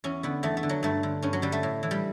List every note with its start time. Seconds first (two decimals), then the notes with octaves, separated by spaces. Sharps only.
0.04 E2 C#4
0.23 D3 B3
0.43 E2 A3
0.57 A3
0.63 D3
0.69 F#3
0.83 G2 A3
1.03 D3
1.22 G2 C#4
1.33 F#3
1.42 D3 G3
1.52 A3
1.63 A2
1.83 E3
1.91 G3